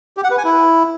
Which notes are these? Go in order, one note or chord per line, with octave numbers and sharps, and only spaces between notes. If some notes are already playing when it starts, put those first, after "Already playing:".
G4
F#5
B4
G#5
E4